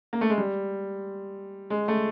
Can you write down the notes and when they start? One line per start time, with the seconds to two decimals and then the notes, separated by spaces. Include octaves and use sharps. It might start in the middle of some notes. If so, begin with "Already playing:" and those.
0.13 A#3
0.21 A3
0.30 G#3
0.38 G3
1.70 G#3
1.88 A3